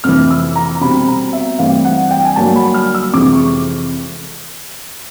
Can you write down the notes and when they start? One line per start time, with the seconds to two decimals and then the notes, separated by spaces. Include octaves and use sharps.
0.04 F2 C3 E3 F6
0.31 E6
0.56 A#5
0.75 A#5
0.81 B2 G3 C4 B5
1.08 A#5
1.33 E5
1.59 G2 E3 A3 C4 F5
1.85 F#5
2.11 G5
2.25 G#5
2.36 G2 D3 F#3 A#3 D4 A5
2.56 B5
2.74 F6
2.95 E6
3.13 F2 C3 E3 G#3 D6
3.33 C#6